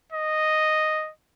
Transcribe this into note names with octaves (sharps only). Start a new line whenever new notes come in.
D#5